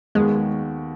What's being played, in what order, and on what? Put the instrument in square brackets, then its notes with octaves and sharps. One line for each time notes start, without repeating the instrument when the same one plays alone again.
[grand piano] D#2 D#3 B3 F#4 [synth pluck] G#3